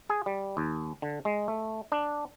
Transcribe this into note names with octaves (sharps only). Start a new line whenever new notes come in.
G#4
G3
D#2
D3
G#3
A3
D4